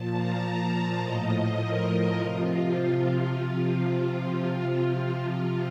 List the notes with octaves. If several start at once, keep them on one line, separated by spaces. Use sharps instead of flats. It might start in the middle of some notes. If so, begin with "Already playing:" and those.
Already playing: A#2 F3 A5
A#5
A5
A2 F3 D#5
A#4
A#4
C3 F3 F4